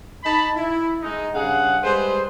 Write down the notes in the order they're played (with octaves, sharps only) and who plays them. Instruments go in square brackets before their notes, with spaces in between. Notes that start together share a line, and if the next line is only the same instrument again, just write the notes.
[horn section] D#4 A5 B5
E4
G#3 D#4
G2 C#3 G#4 F5 F#5
G3 G#3 G#4 B4 C5